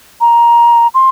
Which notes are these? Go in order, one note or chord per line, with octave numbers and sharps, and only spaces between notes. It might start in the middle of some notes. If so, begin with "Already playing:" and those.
A#5
C6